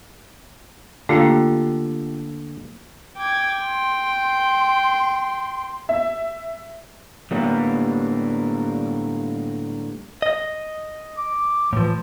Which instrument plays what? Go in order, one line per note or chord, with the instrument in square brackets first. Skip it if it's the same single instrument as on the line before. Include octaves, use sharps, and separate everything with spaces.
[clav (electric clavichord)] D3 [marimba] A3 A#3 [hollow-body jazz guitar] F4 G4 F5
[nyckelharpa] G5 [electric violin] D6 G#6
[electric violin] C6
[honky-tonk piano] E5
[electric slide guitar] A2 D3 G3 A#3 B3
[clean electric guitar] D#5
[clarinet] D6
[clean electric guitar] A2 F3 [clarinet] E3